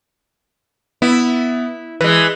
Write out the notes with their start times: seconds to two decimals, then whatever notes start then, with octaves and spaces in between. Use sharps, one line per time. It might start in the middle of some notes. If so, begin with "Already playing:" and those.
1.02 B3 E4
2.01 E3 G#3 B4